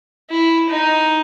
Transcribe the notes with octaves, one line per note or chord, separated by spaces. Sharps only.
E4
D#4